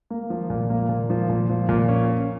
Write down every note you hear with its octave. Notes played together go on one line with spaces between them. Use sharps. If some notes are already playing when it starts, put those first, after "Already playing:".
A#3
F3
A#2
A#3
A#2
F3
A#2
F3
A#2
C#4
C#4